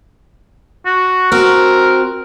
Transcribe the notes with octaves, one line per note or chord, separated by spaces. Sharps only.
F#4
C4 F#4 A#4